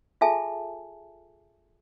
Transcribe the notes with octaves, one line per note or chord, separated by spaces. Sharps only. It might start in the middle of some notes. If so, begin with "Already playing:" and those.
F4 G#4 A4 E5 G#5 A5